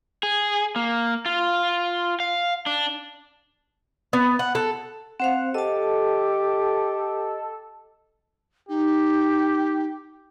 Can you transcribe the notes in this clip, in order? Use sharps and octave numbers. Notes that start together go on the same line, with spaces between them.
G#4
A#3
F4
F5
D4
B3
F#5
A4
C4 C5 F5 F#5
G4 A4 D#5 A5
D#4 G4